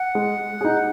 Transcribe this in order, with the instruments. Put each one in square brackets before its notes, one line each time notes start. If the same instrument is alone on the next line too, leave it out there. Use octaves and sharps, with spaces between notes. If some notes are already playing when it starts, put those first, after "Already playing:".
Already playing: [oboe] F#5
[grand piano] G#3
D#4 G#4